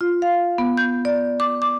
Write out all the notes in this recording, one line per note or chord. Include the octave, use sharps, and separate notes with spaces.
F4
F5
B3
G6
D5
D6
D6